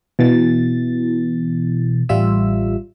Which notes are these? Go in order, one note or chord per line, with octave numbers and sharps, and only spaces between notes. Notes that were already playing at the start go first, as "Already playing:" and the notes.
B2 E3 A6
A1 G3 F4 E5 E6